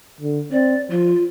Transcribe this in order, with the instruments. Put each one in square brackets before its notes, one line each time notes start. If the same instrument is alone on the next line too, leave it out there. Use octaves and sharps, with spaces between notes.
[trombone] D3
[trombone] C4 [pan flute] D5
[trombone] F3 [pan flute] F4